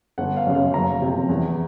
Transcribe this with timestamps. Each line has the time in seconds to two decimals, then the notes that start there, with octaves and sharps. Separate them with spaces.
0.18 G1 F#5
0.37 F5
0.47 F#2 C#3
0.55 F5
0.74 F#1 A#5
1.02 F2 C3
1.29 E2